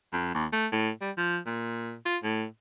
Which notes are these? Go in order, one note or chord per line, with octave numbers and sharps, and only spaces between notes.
F2
D#2
A3
A2
G3
F3
A#2
F4
A2